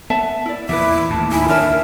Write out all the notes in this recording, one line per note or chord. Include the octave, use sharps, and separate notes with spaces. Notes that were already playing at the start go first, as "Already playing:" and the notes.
B3 E5 A5
E4 D5
E2 A#2 E4 B4 E5 D6
D#2 A2 A5
D#4 E4 G#5
D#2 D3 D4 A#4 C#5 E5 A5